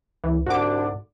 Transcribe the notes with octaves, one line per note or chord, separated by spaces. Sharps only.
C#2 E3
C2 G#2 D3 D4 F#4 D6